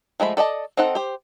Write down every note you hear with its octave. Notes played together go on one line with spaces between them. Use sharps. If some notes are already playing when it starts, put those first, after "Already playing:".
F3 G#3 A3 B5
A4 D5 D#5 A5
C4 D#4 A4 F#5
G4 C5